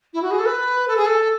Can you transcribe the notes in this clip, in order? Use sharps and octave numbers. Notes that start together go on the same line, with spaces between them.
E4
F#4
G#4
A4
B4
A4
G#4
A4